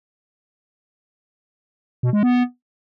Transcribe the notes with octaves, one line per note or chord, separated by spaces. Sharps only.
B2
G#3
B3